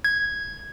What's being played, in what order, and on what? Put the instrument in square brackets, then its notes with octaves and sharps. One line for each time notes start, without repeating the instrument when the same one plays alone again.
[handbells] G#6